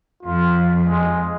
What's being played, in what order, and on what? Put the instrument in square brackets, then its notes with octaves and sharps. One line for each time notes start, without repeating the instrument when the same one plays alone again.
[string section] F2 [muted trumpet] F4
[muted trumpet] G#3